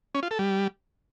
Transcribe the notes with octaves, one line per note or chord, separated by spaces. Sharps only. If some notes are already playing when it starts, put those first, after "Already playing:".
C#4
F4
A4
G3